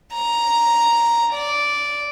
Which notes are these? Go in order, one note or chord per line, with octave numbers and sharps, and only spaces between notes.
A#5
D5